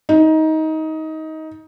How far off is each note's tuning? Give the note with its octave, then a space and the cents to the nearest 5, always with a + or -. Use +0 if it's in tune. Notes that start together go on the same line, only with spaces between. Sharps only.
D#4 +20